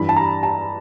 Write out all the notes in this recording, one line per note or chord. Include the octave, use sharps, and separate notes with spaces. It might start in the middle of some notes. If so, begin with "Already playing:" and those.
Already playing: G2 E3 B5
A5
A#5
A5